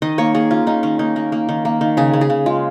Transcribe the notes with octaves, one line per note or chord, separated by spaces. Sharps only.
D#3 D#5
A#3 C#5
A#3 G#4
C#4 F4
C#4 D#4
D#3 C#4
A#3 D#4
A#3
A#3
D#3
A#3
D#3
C#3 G#4
C#3
G#4
C#3
G#3 F4